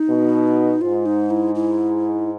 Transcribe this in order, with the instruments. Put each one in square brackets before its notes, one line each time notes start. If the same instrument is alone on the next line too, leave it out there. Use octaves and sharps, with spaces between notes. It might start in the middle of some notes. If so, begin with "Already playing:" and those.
Already playing: [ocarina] D#4
[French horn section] B2
[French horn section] G#2 [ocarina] F4
[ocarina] D#4
E4
E4